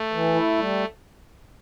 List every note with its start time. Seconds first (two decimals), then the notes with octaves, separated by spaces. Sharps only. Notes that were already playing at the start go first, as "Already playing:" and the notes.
Already playing: A3
0.12 E3
0.34 E4
0.58 G3